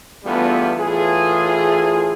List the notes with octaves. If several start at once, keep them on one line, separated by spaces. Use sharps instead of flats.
E2 D3 G3 A3 B3 F4
A2 E3 F4 G#4